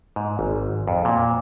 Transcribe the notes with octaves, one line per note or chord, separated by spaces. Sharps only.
G#2
G#1
F2
A#2